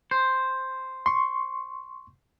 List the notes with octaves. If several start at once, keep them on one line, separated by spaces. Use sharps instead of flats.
C5
C6 C#6